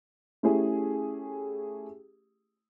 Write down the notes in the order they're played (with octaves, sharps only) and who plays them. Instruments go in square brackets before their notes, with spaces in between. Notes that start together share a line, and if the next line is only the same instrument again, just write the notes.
[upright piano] A3 C#4 E4 G4 G#4